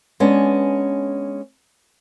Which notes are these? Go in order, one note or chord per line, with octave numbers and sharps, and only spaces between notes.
G#3 B3 C#4 D4